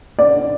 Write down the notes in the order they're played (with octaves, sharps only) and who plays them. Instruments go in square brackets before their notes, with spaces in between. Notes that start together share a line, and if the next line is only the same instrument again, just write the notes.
[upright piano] D5